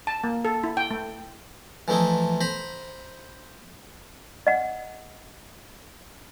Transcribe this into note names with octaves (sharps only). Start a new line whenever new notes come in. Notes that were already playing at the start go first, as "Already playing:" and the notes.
A5
A#3
A4
E4
G5
A3
E3 F3 A3 D#4 E4
C5 A#5 B5
D#5 F#5